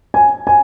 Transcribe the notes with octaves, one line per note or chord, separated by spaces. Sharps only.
G#5
G#5